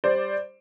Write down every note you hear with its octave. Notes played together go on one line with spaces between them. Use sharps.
G3 C5 D5